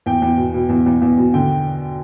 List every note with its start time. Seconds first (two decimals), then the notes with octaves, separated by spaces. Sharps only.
0.06 E2 G5
0.22 E2
0.37 B2
0.54 B2
0.69 E2
0.86 E2
1.02 E2
1.17 B2
1.34 D3 G5